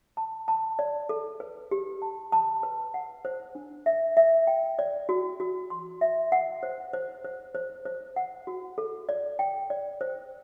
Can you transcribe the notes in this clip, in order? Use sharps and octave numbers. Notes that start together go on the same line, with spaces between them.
A5
A5
D5
A4
B4
G4
A5
A5
B4
F#5
C5
D4
E5
E5
G5
D5
F#4
F#4
C6
E5
F#5
C5
C5
C5
C5
C5
F#5
F#4
A4
D5
G5
D5
C5